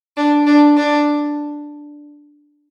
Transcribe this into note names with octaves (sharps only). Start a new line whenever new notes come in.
D4
D4
D4